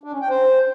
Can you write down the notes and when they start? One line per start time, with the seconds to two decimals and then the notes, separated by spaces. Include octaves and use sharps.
0.04 D4
0.12 C#4
0.21 G5
0.30 C5